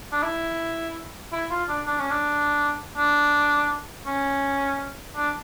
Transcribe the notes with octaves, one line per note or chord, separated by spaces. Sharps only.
D4
E4
E4
F4
D4
D4
C#4
D4
D4
C#4
D4